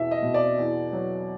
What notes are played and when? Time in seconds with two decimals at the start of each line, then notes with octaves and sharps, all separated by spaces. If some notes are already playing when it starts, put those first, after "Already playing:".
Already playing: E2 B2 E5
0.11 D#5
0.22 B2
0.34 D5
0.58 E2
0.93 F#3